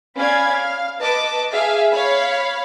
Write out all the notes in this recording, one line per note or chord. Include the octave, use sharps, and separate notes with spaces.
C#4 D5 F5 B5 G#6
F5
B4 D#5 A5 D6
G#4 E5 F5
C#5 F5 B5